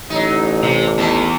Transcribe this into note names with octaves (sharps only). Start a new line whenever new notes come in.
A1 F#3 D#4
C3
E2 D#3 A4